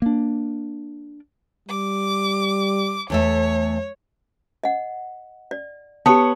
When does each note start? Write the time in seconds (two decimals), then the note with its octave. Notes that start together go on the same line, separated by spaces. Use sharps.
0.02 A#3 D4
1.69 G3 D6
3.10 E2 A3 C#5 E5
4.64 D#5 F#5
5.51 D5
6.06 B3 G4 C#5 A5